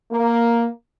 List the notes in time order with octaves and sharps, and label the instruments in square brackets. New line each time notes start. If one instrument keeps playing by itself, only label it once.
[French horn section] A#3